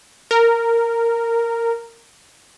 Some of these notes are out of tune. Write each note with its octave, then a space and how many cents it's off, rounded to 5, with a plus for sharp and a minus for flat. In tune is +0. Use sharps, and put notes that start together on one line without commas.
A#4 -10